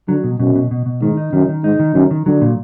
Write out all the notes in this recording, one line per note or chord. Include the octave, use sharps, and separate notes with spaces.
D3 F#3
B2
F#2 B2
B2
B2
B2
G#2 D#3
D#4
F#2 D#3
D#3
G#2 D#4
D#3
F#2 D#3
D#3
D3 F#3
A#2